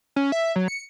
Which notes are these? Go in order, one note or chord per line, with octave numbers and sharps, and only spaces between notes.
C#4
E5
F#3
C#7